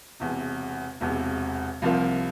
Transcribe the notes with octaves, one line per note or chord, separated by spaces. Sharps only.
E1 E2 C3
E1 E2 C3
C2 C3 F3 A#3 F4